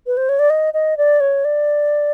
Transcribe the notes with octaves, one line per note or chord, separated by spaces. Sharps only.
B4
C5
C#5
D5
D#5
D#5
D5
C#5
D5